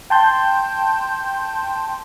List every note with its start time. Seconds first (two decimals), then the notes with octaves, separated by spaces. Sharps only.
0.10 G5 A5 C6 G6